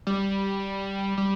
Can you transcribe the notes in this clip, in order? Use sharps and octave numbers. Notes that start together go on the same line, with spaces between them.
G3
G3